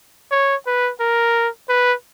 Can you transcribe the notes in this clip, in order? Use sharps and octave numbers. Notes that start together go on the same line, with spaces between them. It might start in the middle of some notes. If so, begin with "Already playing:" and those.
C#5
B4
A#4
B4